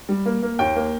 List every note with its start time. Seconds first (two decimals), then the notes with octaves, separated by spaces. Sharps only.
0.09 G3
0.26 A#3
0.43 A#3
0.59 D#2 G5
0.76 A#3